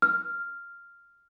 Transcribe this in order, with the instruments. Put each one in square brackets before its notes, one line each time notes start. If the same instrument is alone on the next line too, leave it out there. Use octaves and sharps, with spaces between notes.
[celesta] F6